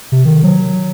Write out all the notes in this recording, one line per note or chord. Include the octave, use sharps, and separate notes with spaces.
C3
D#3
F#3